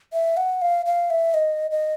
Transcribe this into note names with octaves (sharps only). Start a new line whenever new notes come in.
E5
F#5
F5
F5
E5
D#5
D#5